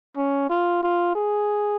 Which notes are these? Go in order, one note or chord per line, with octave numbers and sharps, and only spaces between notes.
C#4
F4
F4
G#4